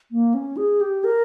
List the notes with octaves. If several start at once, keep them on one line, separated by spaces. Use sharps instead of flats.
A#3
C#4
G#4
G4
A#4